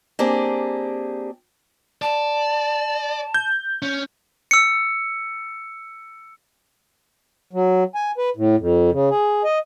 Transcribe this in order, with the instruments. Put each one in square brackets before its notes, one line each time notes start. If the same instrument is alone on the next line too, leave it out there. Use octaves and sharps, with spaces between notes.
[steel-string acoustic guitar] A#3 C4 D4 G4 G#4
[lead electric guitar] D5 [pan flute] A5
[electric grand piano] G6
[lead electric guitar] C#4
[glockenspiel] E6 C#7
[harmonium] F#3
G#5
B4
A2
F2
C#3
G#4
D#5